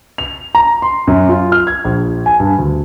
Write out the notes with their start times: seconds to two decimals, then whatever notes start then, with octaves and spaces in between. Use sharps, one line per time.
0.18 F7
0.55 A#5
0.82 C6
1.07 F#2
1.29 F4
1.52 F6
1.67 G#6
1.85 A#1
2.26 G#5
2.40 G2
2.58 D2